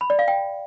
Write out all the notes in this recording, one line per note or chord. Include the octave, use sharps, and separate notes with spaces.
B5
D5
F5
G5